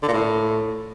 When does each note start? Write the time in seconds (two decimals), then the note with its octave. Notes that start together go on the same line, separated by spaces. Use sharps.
0.03 D3
0.08 A#2
0.13 A2